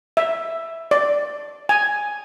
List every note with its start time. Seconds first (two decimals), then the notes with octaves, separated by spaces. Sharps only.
0.17 E5
0.91 D5
1.69 G#5